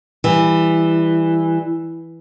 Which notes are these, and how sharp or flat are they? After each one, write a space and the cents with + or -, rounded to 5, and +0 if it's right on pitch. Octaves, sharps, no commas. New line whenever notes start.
E3 +0 G3 +15